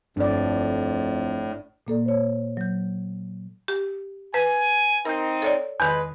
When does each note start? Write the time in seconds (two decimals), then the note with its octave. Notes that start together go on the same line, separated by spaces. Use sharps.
0.17 G1 F2 A2 D4 D5
1.87 A#2 A#3 A4 D5
2.05 C5 C#5
2.57 F#3 G6
3.68 G4
4.34 B4 G#5
5.05 C4 D#4 A#4 G6
5.42 A4 C#5 D5
5.80 E2 D#3 G#3 B4